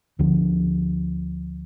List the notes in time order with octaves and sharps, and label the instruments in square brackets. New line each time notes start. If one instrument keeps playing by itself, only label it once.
[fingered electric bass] D2 D3 F3